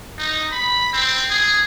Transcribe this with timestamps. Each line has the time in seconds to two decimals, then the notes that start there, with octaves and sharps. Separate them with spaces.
0.18 D#4
0.52 B5
0.93 C4
1.31 G#4